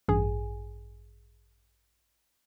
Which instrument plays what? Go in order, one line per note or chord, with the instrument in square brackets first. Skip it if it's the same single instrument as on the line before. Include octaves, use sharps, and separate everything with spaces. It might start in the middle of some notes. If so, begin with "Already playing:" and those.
[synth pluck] A1 G2 G#4 G#5